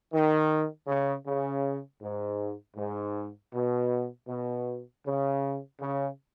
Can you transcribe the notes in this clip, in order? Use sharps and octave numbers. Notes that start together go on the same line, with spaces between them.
D#3
C#3
C#3
G#2
G#2
B2
B2
C#3
C#3